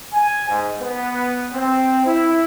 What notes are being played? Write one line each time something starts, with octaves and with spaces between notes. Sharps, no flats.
G#5
G#2
B3
C4
E4